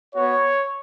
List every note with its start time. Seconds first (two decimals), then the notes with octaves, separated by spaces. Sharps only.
0.15 B3 F#4 C#5